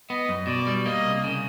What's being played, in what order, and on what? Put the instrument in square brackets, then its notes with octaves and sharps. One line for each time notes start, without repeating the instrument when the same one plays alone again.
[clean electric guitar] B3 [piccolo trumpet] D#5
[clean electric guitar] F#2
[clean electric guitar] B2 [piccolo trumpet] D5
[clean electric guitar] G3
[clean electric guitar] A#3 [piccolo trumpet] D#5
[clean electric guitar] C2
C#3